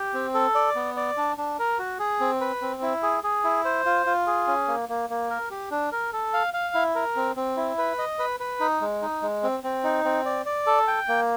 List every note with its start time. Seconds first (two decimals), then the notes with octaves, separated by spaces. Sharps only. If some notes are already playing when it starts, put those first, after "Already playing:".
Already playing: G4
0.14 C4
0.34 A4
0.55 D5
0.75 B3
0.97 D5
1.17 D4
1.38 D4
1.59 A#4
1.79 F#4
1.99 G#4
2.20 C4
2.41 B4
2.62 C4
2.82 E4
3.03 G#4
3.24 G#4
3.44 E4
3.65 C5
3.86 F4
4.06 F4
4.27 G#4
4.47 C#4
4.68 A#3
4.89 A#3
5.10 A#3
5.30 A#4
5.51 G4
5.71 D4
5.92 A#4
6.13 A4
6.34 F5
6.54 F5
6.75 E4
6.95 A#4
7.16 C4
7.36 C4
7.57 E4
7.78 B4
7.98 D#5
8.19 B4
8.40 B4
8.60 D#4
8.81 G#3
9.02 D#4
9.22 G#3
9.43 C4
9.64 C4
9.84 D#4
10.05 C4
10.26 D5
10.46 D5
10.67 A4
10.87 G5
11.08 A#3